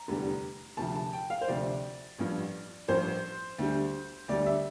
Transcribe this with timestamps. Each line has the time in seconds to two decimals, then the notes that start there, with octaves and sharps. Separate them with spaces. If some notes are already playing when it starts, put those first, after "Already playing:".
Already playing: A#5
0.08 F1 E2 D3 G3
0.77 D2 C3 F3 A5
0.95 A5
1.13 G5
1.30 F5
1.41 C5
1.48 D2 C3 F3 D5
2.19 A1 G2 F3
2.88 A1 G2 F3 C5
3.58 D2 D3 G3
4.28 D2 D3 G3 D5
4.46 E5